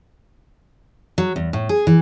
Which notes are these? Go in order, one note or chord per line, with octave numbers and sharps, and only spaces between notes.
F#3
E2
A2
G#4
E3